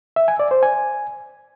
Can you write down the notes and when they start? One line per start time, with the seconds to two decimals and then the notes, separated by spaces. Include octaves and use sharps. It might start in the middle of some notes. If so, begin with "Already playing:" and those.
0.16 E5
0.28 G#5
0.39 D5
0.51 C5
0.63 G#5